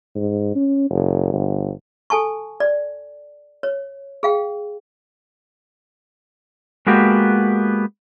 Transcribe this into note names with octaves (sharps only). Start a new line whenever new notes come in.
G#2
C#4
F#1
G1
A4 G#5 A5 C#6
D5
C#5
G#4 F5 G5
G#3 A#3 B3 F#4 G4